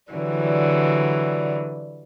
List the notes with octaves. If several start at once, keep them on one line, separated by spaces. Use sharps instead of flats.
D3 E3 F#3 G3